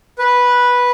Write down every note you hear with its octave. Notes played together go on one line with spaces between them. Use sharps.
B4